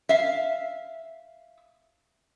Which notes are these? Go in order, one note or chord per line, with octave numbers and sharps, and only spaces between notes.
E5 F5